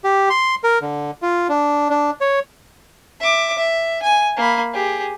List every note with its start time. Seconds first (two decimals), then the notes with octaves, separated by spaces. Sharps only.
0.04 G4
0.30 C6
0.64 A#4
0.82 D3
1.22 F4
1.49 D4
1.90 D4
2.21 C#5
3.20 E5 D6
3.58 E5
4.03 G#5
4.37 A#3 B5
4.74 G4 G#4